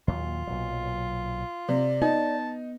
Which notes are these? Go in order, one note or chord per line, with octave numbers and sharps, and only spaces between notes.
D#2 A#2 F#3 F4
B1 A#2 F#3
C3 D5
B3 D#4 A5